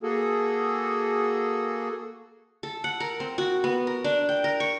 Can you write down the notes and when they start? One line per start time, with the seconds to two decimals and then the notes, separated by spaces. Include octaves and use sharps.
0.03 A#3 F#4 G#4 A4
2.63 A4
2.84 F#5
3.00 A#4
3.20 C4
3.38 F#4
3.64 B3
3.87 A#4
4.04 D4
4.29 G5
4.44 A#4
4.60 C#6